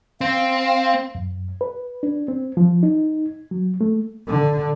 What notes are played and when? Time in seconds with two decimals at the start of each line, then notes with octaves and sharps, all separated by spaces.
0.21 C4 F5
1.15 F#2
1.61 B4
2.03 D4
2.28 C4
2.57 F3
2.83 D#4
3.51 F#3
3.81 A3
4.29 D3